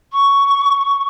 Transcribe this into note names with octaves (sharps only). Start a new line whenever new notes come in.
C#6